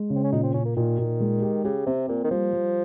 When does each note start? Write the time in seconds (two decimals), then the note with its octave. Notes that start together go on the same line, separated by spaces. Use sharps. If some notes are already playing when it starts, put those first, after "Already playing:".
Already playing: G#3
0.10 C#3
0.16 C4
0.24 C#4
0.32 A#2 D#4
0.43 C4
0.54 A#2 C#4
0.65 A#3
0.76 A#2 D#3
0.99 A#2
1.20 G#3
1.42 G4
1.64 C#3 G4
1.86 C3 C4
2.08 A#2 A#3
2.24 D#3
2.31 F3 G3
2.53 G3